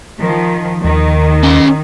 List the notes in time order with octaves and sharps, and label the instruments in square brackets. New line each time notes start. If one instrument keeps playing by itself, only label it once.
[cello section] D#3 F3
[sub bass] D#2 [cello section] D#3
[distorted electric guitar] C#4 D#5